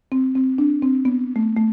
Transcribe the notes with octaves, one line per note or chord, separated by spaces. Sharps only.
C4
C4
D4
C4
B3
A3
A3